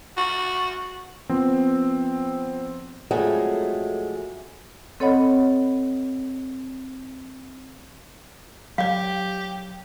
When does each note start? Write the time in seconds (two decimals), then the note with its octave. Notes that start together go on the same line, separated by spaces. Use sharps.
0.17 F#4
1.29 F3 B3 C4
3.11 F2 F#3 G#3 A3 G#4
5.00 C4 A4 C#5 D#5 F#5 B5
8.78 F#3 G4 D5 F5